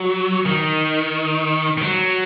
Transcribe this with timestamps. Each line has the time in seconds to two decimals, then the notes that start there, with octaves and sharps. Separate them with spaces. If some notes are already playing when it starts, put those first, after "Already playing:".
Already playing: F#3
0.46 D#3
1.78 D#3
1.81 F#3